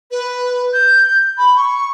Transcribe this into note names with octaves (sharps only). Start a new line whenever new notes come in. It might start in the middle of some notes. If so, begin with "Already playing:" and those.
B4
G6
B5
C#6